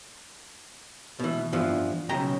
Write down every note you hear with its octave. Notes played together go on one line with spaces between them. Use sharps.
B2 E3
G2 E3 F3 B3
B1 C#3 G5 A#5